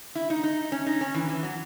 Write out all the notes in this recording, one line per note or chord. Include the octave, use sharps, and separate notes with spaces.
E4
D#4
D#4
C#4
D#4
C#4
E3
E3
F#3